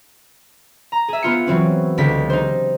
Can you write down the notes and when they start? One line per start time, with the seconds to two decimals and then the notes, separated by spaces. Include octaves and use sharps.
0.92 A#5
1.08 G#4 E5
1.23 B3 F4 C#7
1.46 E3 F#3 C4 C#4
1.98 C#2 D3 G4 B6
2.30 D#4 C5